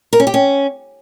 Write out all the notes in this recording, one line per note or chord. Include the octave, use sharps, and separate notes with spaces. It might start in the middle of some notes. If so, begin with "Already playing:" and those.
A#4
C#4
G4
C#4